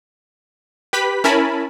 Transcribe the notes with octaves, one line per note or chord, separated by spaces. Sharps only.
G4 B4 B5 B6
C#4 E4 A#4 G#5 A5 B5